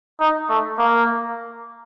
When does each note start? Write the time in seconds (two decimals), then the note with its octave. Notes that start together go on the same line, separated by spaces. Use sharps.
0.20 D#4
0.49 A3
0.78 A#3